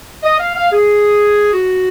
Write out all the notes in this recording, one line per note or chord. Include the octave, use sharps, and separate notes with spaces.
D#5
F5
F5
G#4
F#4